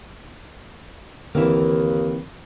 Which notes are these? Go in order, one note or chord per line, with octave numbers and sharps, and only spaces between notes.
D#2 D3 E3 A#3 C4